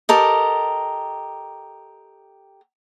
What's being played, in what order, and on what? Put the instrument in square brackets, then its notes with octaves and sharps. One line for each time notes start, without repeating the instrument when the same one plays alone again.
[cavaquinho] G4 A4 A#4 D#5